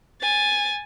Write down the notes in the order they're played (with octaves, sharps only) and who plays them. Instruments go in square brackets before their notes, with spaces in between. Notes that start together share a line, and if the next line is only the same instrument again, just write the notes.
[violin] G#5 A6